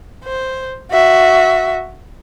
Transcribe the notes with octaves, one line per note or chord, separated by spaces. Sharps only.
C5
F#4 E5